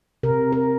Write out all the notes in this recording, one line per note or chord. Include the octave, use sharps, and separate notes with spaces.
C3 A#4
A#4